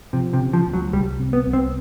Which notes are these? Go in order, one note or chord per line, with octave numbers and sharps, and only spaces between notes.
C3 F3
C3
C#3
F3
D2
F#3
C2 G3
C3
B3
C2
C4